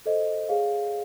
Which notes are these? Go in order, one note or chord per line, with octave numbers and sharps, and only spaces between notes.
A4 C5 D#5
G#4 C#5 F5